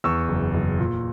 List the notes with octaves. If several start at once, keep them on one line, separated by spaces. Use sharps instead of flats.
E2 C#6 E6
F#1
F#1
A#2